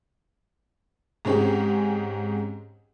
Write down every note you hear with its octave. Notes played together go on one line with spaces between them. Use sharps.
G#2 G#3 C4 C#4 G4 G#4